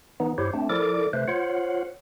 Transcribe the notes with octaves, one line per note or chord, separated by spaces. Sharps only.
E3 B3 D#4
G2 E4 G4 C5 C#5
A3 C4 D4
F3 E4 A4 A#4 D5 D6
C3 A3 B4 C5
F4 C5 C#5 F#5